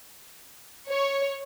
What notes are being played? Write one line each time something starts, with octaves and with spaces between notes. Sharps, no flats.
C#5